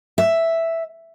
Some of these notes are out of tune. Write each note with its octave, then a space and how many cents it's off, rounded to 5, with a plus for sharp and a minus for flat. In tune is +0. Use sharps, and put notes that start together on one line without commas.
E5 +0